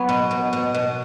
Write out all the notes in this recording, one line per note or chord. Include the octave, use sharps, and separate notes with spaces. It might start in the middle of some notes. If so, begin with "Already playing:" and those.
Already playing: F#3 B3
B2
B2
B2
B2